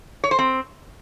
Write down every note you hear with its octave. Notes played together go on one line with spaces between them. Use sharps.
C#5
C5
C4